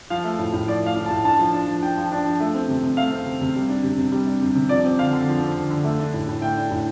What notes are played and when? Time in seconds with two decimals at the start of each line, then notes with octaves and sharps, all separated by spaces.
0.10 F3 F5
0.24 A3
0.39 A2
0.53 A2
0.68 F3 D5
0.82 A3 F5
0.96 A2
1.06 A5
1.11 A2
1.25 D4 A5
1.39 F3
1.53 D4
1.68 F3
1.82 D4 G5
1.97 F3
2.12 D4
2.26 F3
2.40 A3
2.54 C4
2.69 C3
2.83 C3
2.97 A3 F5
3.11 C4
3.26 C3
3.41 C3
3.55 G3
3.69 D4
3.84 C3
3.98 C3
4.12 G3
4.26 D4
4.41 C3
4.55 C3
4.69 F3 D5
4.84 C4
4.99 D3 F5
5.13 D3
5.28 F3
5.42 C4
5.56 D3
5.70 D3
5.84 A3
5.99 D4
6.14 A2
6.28 A2
6.41 A3 G5
6.56 D4
6.71 A2